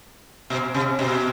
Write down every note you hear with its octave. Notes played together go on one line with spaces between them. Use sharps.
B2
C3
B2